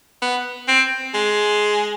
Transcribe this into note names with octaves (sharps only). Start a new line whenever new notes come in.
B3
C4
G#3